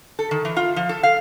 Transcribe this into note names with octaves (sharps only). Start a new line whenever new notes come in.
A4
D#3
E3
F4
F3
A4
F5